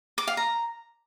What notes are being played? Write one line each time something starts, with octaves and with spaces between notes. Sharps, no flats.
D6
F5
A#5